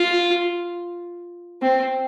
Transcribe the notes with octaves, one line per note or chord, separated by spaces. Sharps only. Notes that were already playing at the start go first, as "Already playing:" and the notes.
Already playing: F4
C4